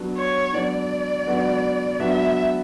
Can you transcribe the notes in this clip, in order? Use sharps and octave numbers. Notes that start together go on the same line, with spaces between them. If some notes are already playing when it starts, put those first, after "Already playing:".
Already playing: F#3 B3 D4 F#4
C#5
F#3 B3 D4 F#4 D5
F#3 B3 D4 F#4
F#3 B3 D4 F#4 E5